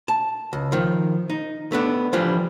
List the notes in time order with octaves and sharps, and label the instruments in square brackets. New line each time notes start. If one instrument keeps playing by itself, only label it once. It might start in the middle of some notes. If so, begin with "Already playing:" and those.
[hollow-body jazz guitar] A5
C#2
D#3 F3
D#4
A3 B3 D4
E3 F3 G3 D4